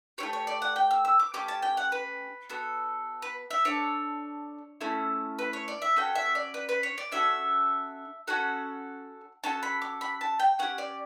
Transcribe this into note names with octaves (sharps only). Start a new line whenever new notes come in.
A3 E4 G4 C#5
C#5
D5
F#5
G5
E6
E6
D6
A3 C#4 G4 D6
A5
G5
F#5
B4
B3 F#4 A4
B4
E5
D4 A4 C#5
A3 C#4 E4 A4
B4
C#5
D5
E5
C#4 F#4 A4 G5
E5
D5
B4
B4
C#5
D5
C#4 F#4 A4 E5
C#4 F#4 A4 F#5
C#4 F#4 A4 A5
B5
D6
B5
A5
G5
C#4 G4 F#5
D5